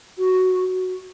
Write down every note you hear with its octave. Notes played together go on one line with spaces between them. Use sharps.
F#4